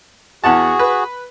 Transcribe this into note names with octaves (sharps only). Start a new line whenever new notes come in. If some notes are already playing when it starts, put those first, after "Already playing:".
E2 F#4 G#4 F#5 A5
B4